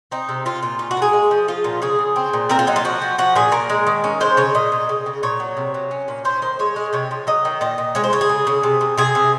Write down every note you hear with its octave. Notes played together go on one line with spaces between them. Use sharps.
C4 D#4
C3
C4 F4
A#2 F4
C#4 F4
F#4
A#3 G#4
G#3
F3
F3 F4
A#2
C#3 G#4
C#3
C4
A#2
C4 A#4
F4
F#3 D#4
F4
F3 F#4
F3
F3 F#4
A#2 G#4
A#2 A#4
G#3
D#3
C#4
G#3 C5
C#3 C#5
A#2 D#5
A#2
C#3
C#3
A#2 C#5
F#3
C3
F#3
C#4
A#2
C#4 C5
D#3 C5
G#3 C#5
G#3
C3 C#5
F3
F#3 D#5
D#3
A#2 D#5
A#2
G#3 C#5
C5
C#3 C#5
G#4
C#3
C#3
C3
C3
C3 G#4
C3